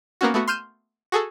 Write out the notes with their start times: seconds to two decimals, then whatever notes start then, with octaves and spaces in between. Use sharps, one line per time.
0.21 A#3 B3 C#4 F#4
0.34 A3 B3 F#4
0.48 C6 F6 G6 D#7 E7
1.12 F#4 G#4 A4